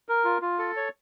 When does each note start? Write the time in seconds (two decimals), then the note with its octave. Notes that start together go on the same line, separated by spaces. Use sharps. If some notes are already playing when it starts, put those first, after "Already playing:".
0.09 A#4
0.25 F4
0.42 F4
0.59 A4
0.77 C#5